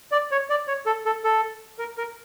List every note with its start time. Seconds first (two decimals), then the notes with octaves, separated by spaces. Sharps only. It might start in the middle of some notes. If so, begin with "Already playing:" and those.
0.12 D5
0.31 C#5
0.50 D5
0.67 C#5
0.86 A4
1.06 A4
1.24 A4
1.79 A#4
1.98 A#4